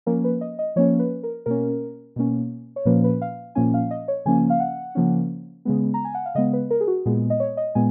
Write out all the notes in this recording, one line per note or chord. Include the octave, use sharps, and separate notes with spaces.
F3 A#3 C#4 A#4
B4
D#5
D#5
F3 A#3 C#4 C#5
B4
A#4
B2 A#3 C#4 A#4
B2 A#3 C#4
C#5
A#2 F3 A#3 C#4 B4
B4
F5
A#2 F3 A#3 C#4 G#5
F5
D#5
C#5
C#3 F3 A#3 C#4 G#5
F5
F#5
C#3 F3 A#3 C#4
C#3 G#3 B3
A#5
G#5
F#5
F5
C#3 G#3 B3 D#5
B4
A#4
G#4
F#4
A#2 G#3 B3 G#4
D#5
C#5
D#5
A#2 G#3 B3 G#5